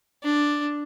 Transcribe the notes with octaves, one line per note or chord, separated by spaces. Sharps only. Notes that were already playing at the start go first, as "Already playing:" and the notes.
D4